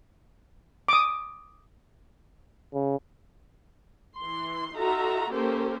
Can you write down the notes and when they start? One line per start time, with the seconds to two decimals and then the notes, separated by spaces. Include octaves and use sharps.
0.88 D6 D#6
2.73 C#3
4.18 E3 C6
4.75 D#4 F4 F#4 A4 E5 A#5
5.31 A#3 C#4 G4 A4 A#4 C5